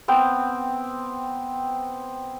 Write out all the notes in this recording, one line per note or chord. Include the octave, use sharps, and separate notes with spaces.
B3 C4 G5